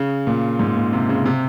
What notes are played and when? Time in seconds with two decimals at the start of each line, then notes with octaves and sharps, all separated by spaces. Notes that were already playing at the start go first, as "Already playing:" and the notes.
Already playing: C#3
0.27 A#2
0.59 G#2
0.76 A#2
0.92 C3
1.09 C#3
1.26 C3